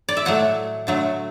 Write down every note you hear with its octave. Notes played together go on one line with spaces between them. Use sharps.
D5
E5
A2 F#3 A3 F#5
D3 F#3 A3